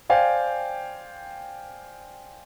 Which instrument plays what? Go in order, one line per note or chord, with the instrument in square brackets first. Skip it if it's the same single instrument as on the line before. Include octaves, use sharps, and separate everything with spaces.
[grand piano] C5 D5 F5 G5 G#5